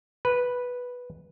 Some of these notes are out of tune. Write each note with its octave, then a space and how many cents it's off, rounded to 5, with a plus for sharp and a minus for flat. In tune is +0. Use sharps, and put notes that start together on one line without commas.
B4 -5